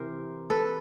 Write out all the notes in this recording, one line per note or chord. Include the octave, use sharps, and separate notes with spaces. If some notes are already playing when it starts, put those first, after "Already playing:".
Already playing: C3 E3 C4 A#4 C5
A4 B4